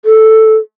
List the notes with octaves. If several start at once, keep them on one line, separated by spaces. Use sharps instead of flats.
A4